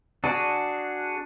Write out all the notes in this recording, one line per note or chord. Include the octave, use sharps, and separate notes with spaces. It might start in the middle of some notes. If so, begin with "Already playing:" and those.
D4 F#4 G#4